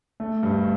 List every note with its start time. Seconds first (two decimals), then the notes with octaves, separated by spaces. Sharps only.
0.20 A3
0.43 G2